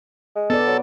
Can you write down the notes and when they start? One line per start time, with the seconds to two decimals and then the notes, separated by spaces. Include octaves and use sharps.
0.36 G#3
0.50 B3 A4 D5
0.67 F#3